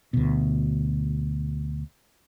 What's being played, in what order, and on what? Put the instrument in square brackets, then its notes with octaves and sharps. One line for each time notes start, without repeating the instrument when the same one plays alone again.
[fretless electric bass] D2 B2